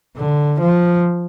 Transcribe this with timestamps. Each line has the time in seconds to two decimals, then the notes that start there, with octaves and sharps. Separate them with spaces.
0.17 D3
0.60 F3